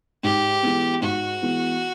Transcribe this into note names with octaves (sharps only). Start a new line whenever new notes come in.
G#2 G4
E3 G#3 B3
G#2 F#4
E3 G#3 B3